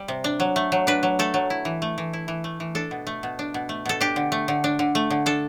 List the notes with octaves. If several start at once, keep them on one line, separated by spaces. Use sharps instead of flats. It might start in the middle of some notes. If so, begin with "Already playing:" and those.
Already playing: G3
C3
D4
F#3
A3
F#3
D4 B4
F#3
A3 A4
F#3
E4
E3
A3
E3
E4
E3
A3
E3
D4 A4
B2
A3
B2
D4
B2
A3
B2 A4
D4 G4
D3
A3
D3
D4
D3
A3
D3
D4 A4